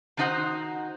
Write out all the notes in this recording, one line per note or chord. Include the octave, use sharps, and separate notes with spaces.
D#3 D4 D#4 F#4 C5 F#5